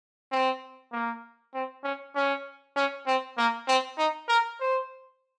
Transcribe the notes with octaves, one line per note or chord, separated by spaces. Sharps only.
C4
A#3
C4
C#4
C#4
C#4
C4
A#3
C4
D#4
A#4
C5